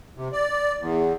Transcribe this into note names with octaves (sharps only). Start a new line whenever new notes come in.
C3
D5
E2